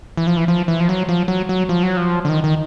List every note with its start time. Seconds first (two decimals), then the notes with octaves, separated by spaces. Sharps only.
0.17 E3
0.27 F3
0.37 E3
0.48 F3
0.68 E3
0.80 F3
0.89 F#3
1.09 F3
1.28 F#3
1.49 F#3
1.69 F3
1.83 F#3
1.97 F3
2.25 D3
2.29 D#3
2.44 D#3